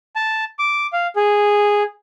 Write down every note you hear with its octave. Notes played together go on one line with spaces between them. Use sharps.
A5
D6
F5
G#4